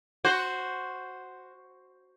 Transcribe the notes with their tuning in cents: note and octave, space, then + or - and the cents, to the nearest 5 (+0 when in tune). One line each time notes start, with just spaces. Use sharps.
F#4 +0 C5 +0